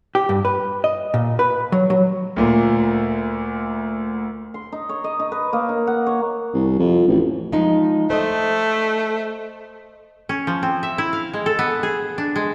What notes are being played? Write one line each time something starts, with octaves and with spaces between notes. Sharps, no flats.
G4
G2
B4
D#5
A#2
B4
F#3
F#3
D2 A#2 A#3
C6
D#4
C#5
D#5
D#4
B4
A#3
D#4
F#5
C#5
C2
F2
A1
F3 G#3 D#4
A3 C5 D#5
C#4
F3
C4
E5
E4
F5
G#3
A4
B3
G#4
D4
G#3